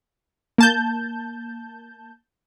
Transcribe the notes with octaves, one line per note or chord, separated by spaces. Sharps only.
A#3 A5 G6